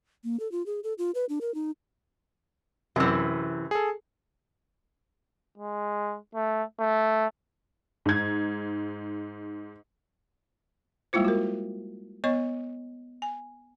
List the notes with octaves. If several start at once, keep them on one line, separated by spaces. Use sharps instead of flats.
A#3
A4
F4
G#4
A4
F4
B4
D4
A#4
D#4
F#2 C3 E3 E6
G#4 A4
G#3
A3
A3
G#2 G#6
G3 G#3 A#3 E4 F4 C5
F#4 A#4
B3 C#5 D#5 C#6
G#5